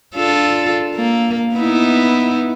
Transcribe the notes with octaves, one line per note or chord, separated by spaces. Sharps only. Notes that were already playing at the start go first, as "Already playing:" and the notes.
D4 F4 A4
A#3
B3 D#4 E4